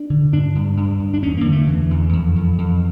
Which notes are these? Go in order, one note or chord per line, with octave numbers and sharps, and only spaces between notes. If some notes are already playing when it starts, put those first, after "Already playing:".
Already playing: D4
D3
G2 D4
G2
G2
G2
D4
E2 C#4
A#3
D3
A3
E2 E3
E2
F2
F2
F2